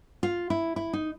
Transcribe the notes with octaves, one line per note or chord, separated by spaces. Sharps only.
F4
E4
E4
D#4